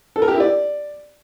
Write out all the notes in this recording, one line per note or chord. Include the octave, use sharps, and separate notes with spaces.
A4
A#4
G4
E4
D5